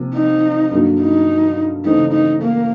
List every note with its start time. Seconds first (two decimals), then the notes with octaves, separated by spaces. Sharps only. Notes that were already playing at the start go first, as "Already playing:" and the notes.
Already playing: C3 F3 A#3
0.15 D#4
0.71 G2 D3 F#3 A#3
1.00 D#4
1.85 C#3 E3 A3 C4 D#4
2.13 D#4
2.42 A#3